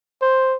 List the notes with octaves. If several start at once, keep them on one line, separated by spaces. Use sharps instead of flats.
C5